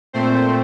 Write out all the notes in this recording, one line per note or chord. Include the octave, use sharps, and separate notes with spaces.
A#2 A3 C4 C5